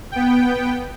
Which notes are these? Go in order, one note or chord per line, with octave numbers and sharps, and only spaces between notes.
B3 G5